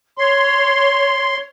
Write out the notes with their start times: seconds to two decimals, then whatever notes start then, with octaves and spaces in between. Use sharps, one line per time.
0.18 C#5 C6